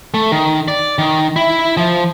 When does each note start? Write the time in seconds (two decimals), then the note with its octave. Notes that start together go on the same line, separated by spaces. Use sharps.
0.14 A3
0.32 D#3
0.68 D5
0.98 D#3
1.36 E4
1.77 F3